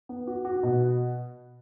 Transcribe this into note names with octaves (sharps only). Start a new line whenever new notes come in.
B3
F#4
F#4
B2